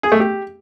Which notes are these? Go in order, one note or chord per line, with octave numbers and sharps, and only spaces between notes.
G#4
A3
G4